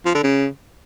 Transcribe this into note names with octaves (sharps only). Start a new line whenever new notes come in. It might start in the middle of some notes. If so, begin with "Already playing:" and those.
F3
D3
C#3